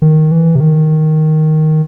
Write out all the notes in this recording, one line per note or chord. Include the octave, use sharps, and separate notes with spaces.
D#3
E3
C3
D#3